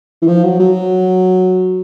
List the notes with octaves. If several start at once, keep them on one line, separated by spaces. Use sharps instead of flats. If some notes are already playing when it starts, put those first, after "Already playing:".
E3
F3
F#3
F#3